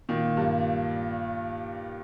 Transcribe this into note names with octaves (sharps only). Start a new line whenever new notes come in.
A#2 D#3
G2